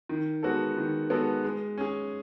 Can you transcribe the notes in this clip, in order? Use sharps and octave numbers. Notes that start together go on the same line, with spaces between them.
D#3
G#3 B3 F#4 A4
D#3
G#3 B3 F#4 A4
G#3
C#4 G#4